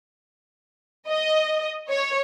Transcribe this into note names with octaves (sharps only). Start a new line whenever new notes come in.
D#5
C#5